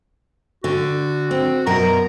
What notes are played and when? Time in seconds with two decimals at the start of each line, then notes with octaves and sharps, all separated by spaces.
0.64 D3 F#4
1.31 C4
1.66 F#2 B2 A#4 A#5